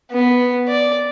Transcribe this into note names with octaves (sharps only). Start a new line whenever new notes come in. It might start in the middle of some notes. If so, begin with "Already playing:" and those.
B3
D5